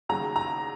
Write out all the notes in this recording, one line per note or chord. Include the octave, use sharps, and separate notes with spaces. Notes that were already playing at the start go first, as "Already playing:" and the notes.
D#2 C#3 F#3 A#5
A#5